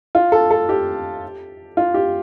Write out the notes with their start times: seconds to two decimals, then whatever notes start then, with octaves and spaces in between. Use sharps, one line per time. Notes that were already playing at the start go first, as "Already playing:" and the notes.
0.15 F4
0.32 A4
0.51 A4
0.69 G4
1.77 F4
1.94 G4